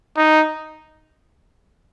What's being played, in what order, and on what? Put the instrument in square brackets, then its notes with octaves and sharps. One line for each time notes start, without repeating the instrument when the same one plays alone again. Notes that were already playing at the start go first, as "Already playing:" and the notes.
[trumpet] D#4